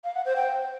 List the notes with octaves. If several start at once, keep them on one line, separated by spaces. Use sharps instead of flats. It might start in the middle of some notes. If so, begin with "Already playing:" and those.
F5
F#5
C5
G5